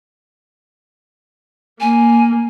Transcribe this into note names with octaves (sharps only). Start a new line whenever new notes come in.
A#3 G#5